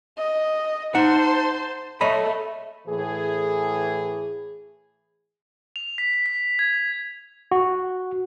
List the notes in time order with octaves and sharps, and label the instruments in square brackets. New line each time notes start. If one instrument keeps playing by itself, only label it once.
[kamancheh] D#5
[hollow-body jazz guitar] D#4 F#5 [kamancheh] C5 A5
[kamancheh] A3 [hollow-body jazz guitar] C#5 D#5 B5
[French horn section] A2 E3 G#4
[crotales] F7
B6
B6
B6
G#6
[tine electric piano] F#4